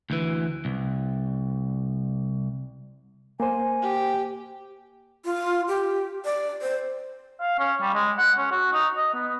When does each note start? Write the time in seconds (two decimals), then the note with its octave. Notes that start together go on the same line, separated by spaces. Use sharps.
0.10 D2 E3
0.65 C2
3.40 A#3 C5 G#5
3.82 G4
5.25 F4
5.68 G4
6.25 D5
6.62 C5
7.41 F5
7.59 C#4
7.81 G3
7.94 G#3
8.18 F#5
8.38 C#4
8.51 F#4
8.73 D#4
8.97 D#5
9.14 B3